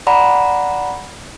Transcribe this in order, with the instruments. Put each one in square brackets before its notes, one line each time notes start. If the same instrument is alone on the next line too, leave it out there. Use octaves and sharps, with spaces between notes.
[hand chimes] D5 F#5 A#5 B5